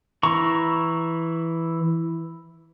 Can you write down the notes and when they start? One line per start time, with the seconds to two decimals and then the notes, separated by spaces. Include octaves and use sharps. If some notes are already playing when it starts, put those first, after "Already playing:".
0.23 E3 E4 A#5 C#6